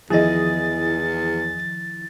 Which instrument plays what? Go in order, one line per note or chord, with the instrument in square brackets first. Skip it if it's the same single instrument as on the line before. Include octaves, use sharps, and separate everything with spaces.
[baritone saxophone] E2 [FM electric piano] D#3 F3 E4 [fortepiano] G#4 D#5 [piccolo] A6